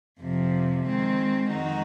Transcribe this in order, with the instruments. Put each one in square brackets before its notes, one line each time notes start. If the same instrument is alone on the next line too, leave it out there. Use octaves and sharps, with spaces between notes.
[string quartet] F2 C3 F3
D#3 G#3 C4
F2 D#3 G#3 D#4 F#4